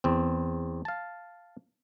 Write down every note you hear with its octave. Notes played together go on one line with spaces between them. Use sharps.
E2 C4
F5 A5